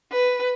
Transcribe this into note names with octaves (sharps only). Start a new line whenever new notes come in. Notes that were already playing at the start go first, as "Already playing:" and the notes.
B4